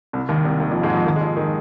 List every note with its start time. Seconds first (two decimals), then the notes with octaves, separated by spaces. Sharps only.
0.13 C2 C3
0.29 D#2 D#3
0.44 C2 C3
0.60 D#2 D#3
0.71 F2 F3
0.83 G#2 G#3
0.94 F2 F3
1.06 D#2 D#3
1.16 G#3
1.21 F2 F3
1.37 D#3